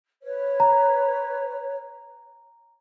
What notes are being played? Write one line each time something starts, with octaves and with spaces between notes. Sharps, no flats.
B4 C#5
A#5